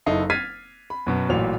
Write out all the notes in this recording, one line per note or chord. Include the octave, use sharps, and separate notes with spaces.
F#1 D#4 E4 A4 C7
F6 G#6 A6 B6 C7 D#7
B5
F#2 B2 B3
A1 A#2 F#3 F7